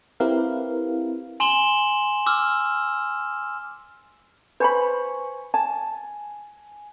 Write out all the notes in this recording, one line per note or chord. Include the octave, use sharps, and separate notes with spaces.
C4 E4 G4 A#4 B4 F5
G#5 C6 E7 F#7 G7
D6 E6 F6
B4 C5 G#5 B5 C#6
G#5 A5